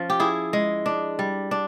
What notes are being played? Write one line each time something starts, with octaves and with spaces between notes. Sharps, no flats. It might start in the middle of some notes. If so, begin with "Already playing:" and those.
Already playing: F3 C#4
G4
E4 G#4
G#3
D4
G3
D4